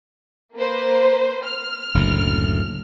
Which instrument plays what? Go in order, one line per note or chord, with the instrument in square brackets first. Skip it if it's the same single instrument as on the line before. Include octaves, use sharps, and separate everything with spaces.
[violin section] A#3 B4 C5
F6
[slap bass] F#1 D2 A2